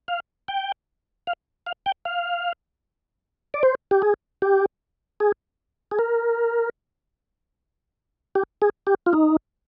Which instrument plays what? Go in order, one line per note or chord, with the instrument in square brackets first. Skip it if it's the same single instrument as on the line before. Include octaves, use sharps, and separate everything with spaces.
[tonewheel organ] F5
G5
F5
F5
G5
F5
D5
C5
G4
G#4
G4
G#4
G#4
A#4
G4
G#4
G4
F4
D#4